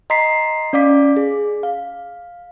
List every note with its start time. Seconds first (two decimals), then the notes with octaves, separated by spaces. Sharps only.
0.10 D#5 A#5 C6 B6 C7
0.73 C#4 D5 F5 D6 B6
1.17 G#4
1.63 F5